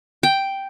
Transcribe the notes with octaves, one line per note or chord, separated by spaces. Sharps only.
G5